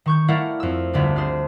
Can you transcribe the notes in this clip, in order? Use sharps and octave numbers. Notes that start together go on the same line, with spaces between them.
D#3 C#6 G6
A3 E4 A#4 D5 F5 F#5
F2 E6
G1 D2 D3 D4
D4 G#4 C5